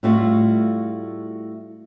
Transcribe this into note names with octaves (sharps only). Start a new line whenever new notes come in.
A2 G3 A3 F4 F#4 F5